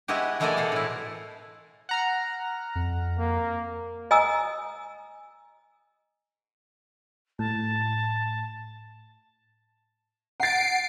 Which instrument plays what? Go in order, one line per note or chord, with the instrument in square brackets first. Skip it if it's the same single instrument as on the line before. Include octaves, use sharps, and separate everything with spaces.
[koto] G#3 B3 E4 F#4 G4
E3 G#3 A3 A4 A#4 D5
B2 F5 F#5
A2 E4
[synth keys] F#5 A#5 F6
[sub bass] F2
[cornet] A#3
[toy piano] D#5 G#5 A#5 D#6 E6
[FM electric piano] A2 [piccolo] A5
[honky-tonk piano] F#5 A6 [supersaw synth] C7 D7